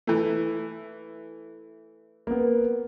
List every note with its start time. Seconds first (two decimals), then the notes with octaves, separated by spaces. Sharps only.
0.07 E3 A3
2.27 A#3 B3